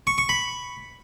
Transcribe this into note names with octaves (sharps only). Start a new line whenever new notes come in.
C#6
C#6
B5